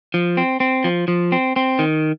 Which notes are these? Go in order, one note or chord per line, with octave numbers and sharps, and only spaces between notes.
F3
C4
C4
F3
F3
C4
C4
D#3